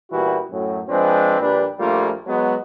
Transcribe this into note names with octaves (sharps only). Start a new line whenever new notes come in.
A#2 E3 G3 B3 E4 F#4
F#2 A2 F#3
F3 G#3 C4 D4 G#4 B4
A#1 A#2 G3 D4 B4
A#1 G3 A3 A#3 F4
F#3 G#3 B3